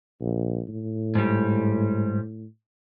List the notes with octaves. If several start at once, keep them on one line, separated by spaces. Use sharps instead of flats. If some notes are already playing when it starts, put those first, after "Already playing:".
A#1
A2
G#2 G3